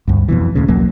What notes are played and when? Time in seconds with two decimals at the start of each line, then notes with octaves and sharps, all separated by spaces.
0.08 D2 G2
0.29 F2 B2 E3
0.55 D#2 A2 C#3
0.68 B1 E2 F#3 A#3